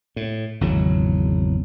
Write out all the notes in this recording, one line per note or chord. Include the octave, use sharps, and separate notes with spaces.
A2
G#1 E2 C#3 F#3